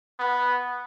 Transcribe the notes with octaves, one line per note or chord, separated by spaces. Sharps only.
B3